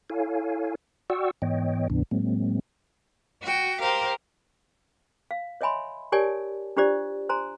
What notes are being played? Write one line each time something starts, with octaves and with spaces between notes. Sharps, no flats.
E4 A4 C#5 F5 G#5
F#4 D5 F#5 G5 C#6 E6
G#2 E3 B3 C#5 D#5 G5
D2 G#2 C3 E3 B3 D4
A2 F#3 G#3 A#3 C4
F#4 G5
G4 A#4 C5 F5
F5
C#5 D#5 E5 G#5 B5 C6
G4 A#4 C#5 D5 G#5 A5
D4 F4 G4 C5 D5
C5 G#5 A#5 C6